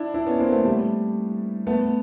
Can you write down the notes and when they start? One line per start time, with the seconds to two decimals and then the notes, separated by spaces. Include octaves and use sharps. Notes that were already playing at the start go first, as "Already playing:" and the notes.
Already playing: D4 E4
0.14 D4 E4
0.27 B3 C#4
0.40 A#3 C4
0.52 A3 B3
0.65 G3 A3
1.67 A3 B3